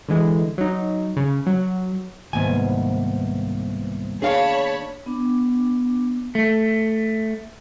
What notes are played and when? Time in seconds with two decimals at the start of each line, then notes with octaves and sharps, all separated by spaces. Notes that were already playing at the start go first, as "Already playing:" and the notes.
0.08 D3 E3 G#3
0.58 F#3 D#4
1.17 C#3
1.46 F#3
2.33 C2 G#2 D#3 A#3 B3 G#5
4.22 D4 G#4 C#5 F5 A5 B5
5.06 B3 D4 D6
6.35 A3